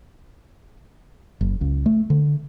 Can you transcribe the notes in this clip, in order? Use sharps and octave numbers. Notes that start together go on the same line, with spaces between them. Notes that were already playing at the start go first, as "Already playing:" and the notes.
F#1
C#2
A3
D3